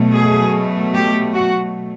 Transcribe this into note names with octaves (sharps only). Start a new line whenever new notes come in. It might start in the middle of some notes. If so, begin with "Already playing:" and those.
Already playing: B2 F#3 A3
G#4
G4
F#4